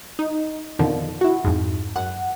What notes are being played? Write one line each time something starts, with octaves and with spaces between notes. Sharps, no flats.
D#4
F2 B2 D3 D#3 F3
E4 F#4
F2 G#2
F#2 F#5